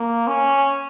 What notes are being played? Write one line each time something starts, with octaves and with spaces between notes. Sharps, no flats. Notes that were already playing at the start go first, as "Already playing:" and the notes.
Already playing: A#3
C#4